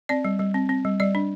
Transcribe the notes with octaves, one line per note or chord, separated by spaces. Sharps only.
C4 D5
G3
G3
C4
C4
G3
G3 D5
D4